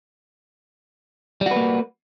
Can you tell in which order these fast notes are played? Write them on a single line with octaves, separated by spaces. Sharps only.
G3 F#4 B4 A#3